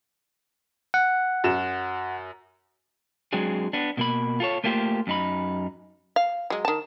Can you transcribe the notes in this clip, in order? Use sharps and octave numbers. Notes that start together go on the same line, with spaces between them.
F#5
F#2 E7
F#3 G#3 C4 D4 G#4
B3 D4
B2 A#3 B5
F4 A4 C#5
A3 A#3 F4 G4 C5
F#2 D#4 B5
F5
F#3 G#3
D#3 A5